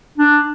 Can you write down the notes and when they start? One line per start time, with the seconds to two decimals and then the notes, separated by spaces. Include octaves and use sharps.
0.18 D4